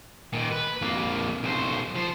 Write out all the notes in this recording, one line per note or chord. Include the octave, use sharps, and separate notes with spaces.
A#2 D#3
B4
F2 A#3
B1 C5
F3 C5